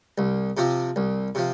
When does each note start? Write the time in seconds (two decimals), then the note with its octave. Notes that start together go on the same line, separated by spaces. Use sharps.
0.18 C2
0.57 C3 F3 C4
0.96 C2
1.35 C3 F3